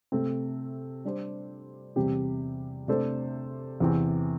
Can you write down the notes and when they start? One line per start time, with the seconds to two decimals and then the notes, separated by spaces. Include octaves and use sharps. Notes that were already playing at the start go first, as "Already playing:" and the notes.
0.12 C3 A3 C4
1.05 G3 D4 C5
1.96 E2 C3 G3 C4 G4
2.88 C3 A3 D4 A4 C5
3.80 E2 C3 E3 C4